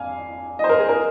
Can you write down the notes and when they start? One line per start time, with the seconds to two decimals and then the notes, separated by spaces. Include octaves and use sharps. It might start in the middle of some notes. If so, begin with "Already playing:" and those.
Already playing: F2 F5 G#5
0.59 D#5
0.64 C5
0.69 A#4
0.79 G#4
0.89 A#4